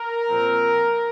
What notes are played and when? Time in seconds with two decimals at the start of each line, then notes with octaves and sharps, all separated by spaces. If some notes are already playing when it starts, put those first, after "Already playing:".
Already playing: A#4
0.28 A#2 F3 C4